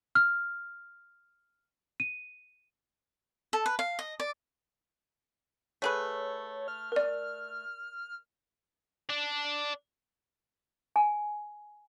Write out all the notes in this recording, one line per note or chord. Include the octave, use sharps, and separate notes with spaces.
F6
D#7
A4
B4
F5
D#5
D5
A3 G#4 B4 C#5
F6
A#4 D5
D4
G#5